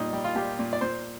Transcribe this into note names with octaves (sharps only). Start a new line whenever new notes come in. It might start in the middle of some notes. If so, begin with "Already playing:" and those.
Already playing: A#2 G3 D#4
G3
F4
A#2 G4
A#2
D5
A#2 C5